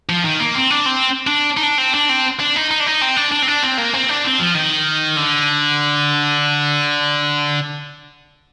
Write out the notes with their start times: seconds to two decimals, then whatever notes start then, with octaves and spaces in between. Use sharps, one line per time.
0.09 F3
0.25 D#3
0.40 A#3
0.55 C4
0.70 D4
0.86 C4
1.27 D4
1.57 D#4
1.63 D4
1.78 C4
1.94 D4
2.09 C4
2.40 D4
2.56 D#4
2.71 D#4
2.80 D4
2.86 D#4
3.02 C4
3.16 D4
3.32 D4
3.43 C4
3.48 D4
3.63 C4
3.78 A#3
3.94 C4
4.09 D4
4.24 C4
4.40 F3
4.55 D#3
5.17 D3